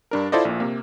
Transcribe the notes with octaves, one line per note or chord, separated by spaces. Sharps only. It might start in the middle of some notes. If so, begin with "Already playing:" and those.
G2 D4 A#4
E4 F4 A4 C5 D5 D#5
A#1 A#2
C3 A#3